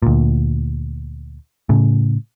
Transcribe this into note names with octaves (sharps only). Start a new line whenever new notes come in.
D2 A#2
A2 C#3